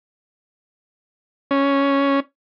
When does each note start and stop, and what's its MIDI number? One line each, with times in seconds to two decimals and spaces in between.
1.51 2.20 61